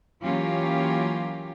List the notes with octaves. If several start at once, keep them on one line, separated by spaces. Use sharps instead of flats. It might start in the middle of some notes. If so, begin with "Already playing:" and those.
E3 F#3 A#3 C#4 F4 G4